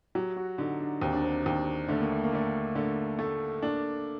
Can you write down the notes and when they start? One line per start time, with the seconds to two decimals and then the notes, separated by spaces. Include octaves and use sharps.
0.15 F#3 G4
0.37 F#4
0.58 D3 D#4
0.80 D4
1.02 D#2 C4
1.13 D4
1.23 C4
1.46 D#2
1.88 D3 A3
2.01 A#3
2.12 A3
2.24 A#3
2.32 D3 A3
2.75 D3 A3
3.19 A3
3.62 A#3 D4